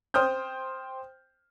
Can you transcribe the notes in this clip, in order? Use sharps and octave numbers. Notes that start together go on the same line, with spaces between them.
C5 G5 D#6 F6 G6